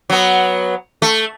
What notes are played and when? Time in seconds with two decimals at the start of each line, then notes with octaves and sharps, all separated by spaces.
0.10 F#3 B3
1.02 A3